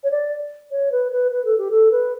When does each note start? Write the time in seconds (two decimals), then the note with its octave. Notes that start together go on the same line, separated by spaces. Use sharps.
0.04 C#5
0.11 D5
0.71 C#5
0.92 B4
1.12 B4
1.31 B4
1.45 A4
1.58 G4
1.71 A4
1.91 B4